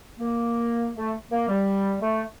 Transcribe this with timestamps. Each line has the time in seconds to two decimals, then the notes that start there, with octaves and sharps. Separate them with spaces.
0.19 A#3
0.96 A3
1.31 A#3
1.48 G3
2.00 A3